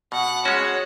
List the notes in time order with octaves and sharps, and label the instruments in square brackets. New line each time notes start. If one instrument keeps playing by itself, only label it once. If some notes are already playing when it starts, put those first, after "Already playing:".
[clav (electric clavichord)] B2 [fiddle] F#5
[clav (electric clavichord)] G#3 C#4 F#4 [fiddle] C#5